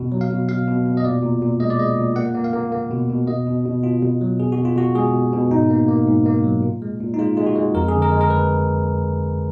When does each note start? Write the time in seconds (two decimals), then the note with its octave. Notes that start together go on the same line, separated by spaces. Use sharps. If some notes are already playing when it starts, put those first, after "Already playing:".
Already playing: B2
0.12 F#3
0.21 F5
0.30 B2
0.49 B2 F5
0.67 B2
0.86 B2
0.97 D#5
1.05 A#2 D5
1.23 A#2
1.42 A#2
1.60 G#3 D#5
1.70 D5
1.79 G#3 D#5
1.98 A#2
2.16 A#3 F#5
2.35 A#3
2.44 F5
2.54 A#3
2.72 A#3
2.91 B2
3.09 B2
3.27 B2 D#5
3.47 B2
3.65 B2
3.84 B2 F4
4.02 B2
4.21 F#3
4.40 B2 G#4
4.52 F#4
4.58 B2
4.65 F4
4.76 B2 F#4
4.95 G#3 G#4
5.14 B2
5.32 B2
5.51 G#2 D#4
5.70 A#3
5.88 A#3
6.07 G#2
6.26 A#3
6.44 F#3
6.63 A#2
6.82 G#3
7.00 A#2
7.14 D#4
7.19 G#3 F4
7.37 G#3 F4
7.47 F#4
7.56 G#3
7.74 F2 A#4
7.88 D3 G#4
8.02 A#4
8.12 G#3
8.21 A#4
8.30 B4